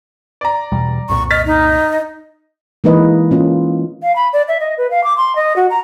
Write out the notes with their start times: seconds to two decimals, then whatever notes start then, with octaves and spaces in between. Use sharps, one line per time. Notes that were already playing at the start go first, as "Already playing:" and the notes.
0.41 D5 A#5
0.72 E2 B2 G3
1.09 C2 F2 A#2 C#6
1.30 D#5 F6 A6 B6
1.46 D#4 D#5
2.84 E3 G#3 A#3 D#4 B4 D#5
3.31 A#3 C#4 F4
4.03 F5
4.16 B5
4.33 D5
4.48 E5
4.60 D#5
4.78 B4
4.91 F5
5.04 D6
5.17 C6
5.36 D#5
5.56 F#4
5.70 A#5